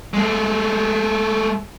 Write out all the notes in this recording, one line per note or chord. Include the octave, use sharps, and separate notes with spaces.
G#3 A3